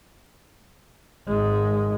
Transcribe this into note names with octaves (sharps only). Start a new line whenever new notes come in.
G#1 G#3